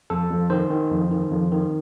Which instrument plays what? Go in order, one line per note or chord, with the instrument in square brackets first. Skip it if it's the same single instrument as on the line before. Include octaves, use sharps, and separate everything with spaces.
[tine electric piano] F2 A4
F2
D#3 C5
D#3
F2
D#3
F2
D#3